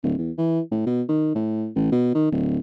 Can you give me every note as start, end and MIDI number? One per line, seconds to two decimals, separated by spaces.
0.03 0.15 26
0.18 0.31 40
0.38 0.60 52
0.71 0.83 45
0.86 1.02 47
1.08 1.32 51
1.35 1.69 45
1.75 1.87 33
1.92 2.11 47
2.15 2.30 51
2.31 2.58 26